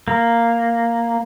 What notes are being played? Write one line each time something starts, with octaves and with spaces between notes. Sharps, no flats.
A#3